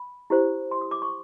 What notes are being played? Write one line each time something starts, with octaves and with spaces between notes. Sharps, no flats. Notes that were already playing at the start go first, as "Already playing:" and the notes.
Already playing: B5
E4 G4 C5
C6
D#6
D6
C#6